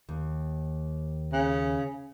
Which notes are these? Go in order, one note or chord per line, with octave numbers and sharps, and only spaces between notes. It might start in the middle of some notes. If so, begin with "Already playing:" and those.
D#2
C#3